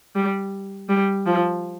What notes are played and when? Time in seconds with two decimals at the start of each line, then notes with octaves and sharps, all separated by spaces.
0.16 G3
0.89 G3
1.26 F3